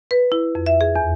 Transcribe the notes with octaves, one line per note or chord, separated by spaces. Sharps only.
B4
E4
F2
E5
G#4
E2